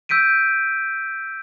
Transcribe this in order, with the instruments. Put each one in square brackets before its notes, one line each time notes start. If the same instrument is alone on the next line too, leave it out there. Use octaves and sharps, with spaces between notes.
[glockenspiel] E6 G6 B6 D7 D#7